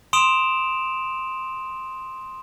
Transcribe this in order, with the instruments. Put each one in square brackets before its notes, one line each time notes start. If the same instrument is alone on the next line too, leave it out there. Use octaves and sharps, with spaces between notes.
[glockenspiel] C6 D#6 D7 E7 F7